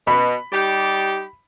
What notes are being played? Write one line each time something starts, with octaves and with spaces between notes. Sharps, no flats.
B2 B5
G3 D#4 G4